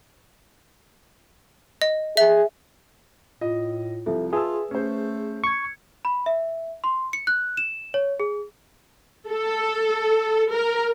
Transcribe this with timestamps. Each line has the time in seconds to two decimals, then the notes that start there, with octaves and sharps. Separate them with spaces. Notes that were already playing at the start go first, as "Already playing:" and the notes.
1.82 D#5
2.17 G#4 E5
3.41 A2 F4 D#5
4.06 C2 F3 A4 E5
4.33 F4 G#4 B4 E5 A5 E6
4.71 A3 C#4 C5
5.44 C#6 G#6 C#7
6.05 B5
6.26 E5
6.84 C6
7.13 C#7
7.27 F#6
7.57 E7
7.94 C#5
8.20 G#4
9.29 A4
10.54 A#4